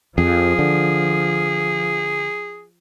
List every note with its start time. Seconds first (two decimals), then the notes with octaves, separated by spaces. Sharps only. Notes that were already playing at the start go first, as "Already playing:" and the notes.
0.18 F2 F3 G#4
0.59 D3